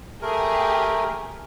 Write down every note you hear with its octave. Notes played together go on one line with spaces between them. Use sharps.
A3 G4 G#4 A#4